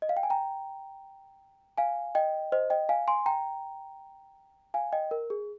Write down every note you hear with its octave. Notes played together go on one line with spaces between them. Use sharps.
D#5
F5
G5
G#5
G5 A#5
F5 G#5
D#5 G5
C5 D#5
D#5 G5
F5 G#5
G#5 C6
G5 A#5
F5 G#5
D#5 G5
A#4
G#4